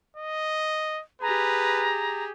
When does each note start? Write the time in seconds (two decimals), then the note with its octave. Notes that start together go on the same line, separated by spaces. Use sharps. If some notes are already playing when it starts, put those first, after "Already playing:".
0.17 D#5
1.22 G4 G#4 B4 A#5